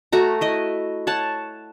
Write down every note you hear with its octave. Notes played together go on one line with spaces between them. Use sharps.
A3 F#4 A#5
E4 D#5
C#5 F#5 A5